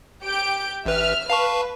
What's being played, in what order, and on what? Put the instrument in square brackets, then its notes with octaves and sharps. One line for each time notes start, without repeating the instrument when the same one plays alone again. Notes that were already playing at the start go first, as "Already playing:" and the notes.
[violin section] G4 G6 D7
[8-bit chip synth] A1 B4 [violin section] E5 F6
[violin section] B4 [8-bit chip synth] F5 A5 C#6